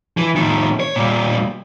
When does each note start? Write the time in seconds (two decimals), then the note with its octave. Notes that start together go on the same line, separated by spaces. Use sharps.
0.17 E3
0.36 A2 D#3
0.80 C#5
0.96 A#2 G3